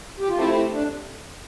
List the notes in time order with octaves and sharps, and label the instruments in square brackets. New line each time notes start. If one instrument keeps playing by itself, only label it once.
[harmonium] G4
F4
[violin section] A3 C4 G4 C5 [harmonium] E4
[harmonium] D4